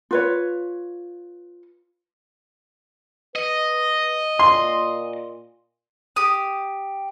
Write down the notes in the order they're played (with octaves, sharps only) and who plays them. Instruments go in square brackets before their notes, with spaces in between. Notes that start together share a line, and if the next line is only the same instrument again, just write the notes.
[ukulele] F4 B4 C#5
[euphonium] B4 [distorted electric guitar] D#5
[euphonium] A#2 [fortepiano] C6
[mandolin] G4 D#6